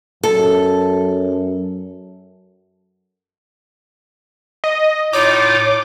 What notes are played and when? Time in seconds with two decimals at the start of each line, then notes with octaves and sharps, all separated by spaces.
0.23 F#2 A4
4.64 D#5
5.13 A2 D#4 F4 C#5 D6